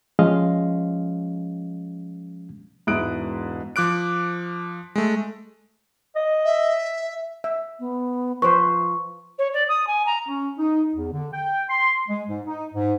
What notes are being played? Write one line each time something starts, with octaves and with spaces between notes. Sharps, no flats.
F3 G#3 C#4 D#5 F5
E1 G#2 E4 D#6 F#6 D7
F3 D6 F#6 D7
G#3 A3
D#5
E5
E5
B3
F3 B4 C5 C#6
C#5
D5
D#6
G#5
A#5
C#4
D#4
E2
D3
G5
C6
G#3
G#2
D#4
G#2